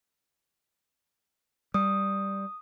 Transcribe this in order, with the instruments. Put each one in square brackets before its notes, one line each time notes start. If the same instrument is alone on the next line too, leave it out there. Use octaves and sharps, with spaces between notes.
[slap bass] G3 [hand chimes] D#6